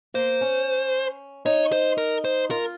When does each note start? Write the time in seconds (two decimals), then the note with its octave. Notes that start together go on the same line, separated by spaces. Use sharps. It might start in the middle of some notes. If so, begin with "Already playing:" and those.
0.14 A#3 C5
0.41 C#4
1.45 D#4 C#5
1.72 C5
1.98 A#4
2.25 C5
2.51 F4 A#4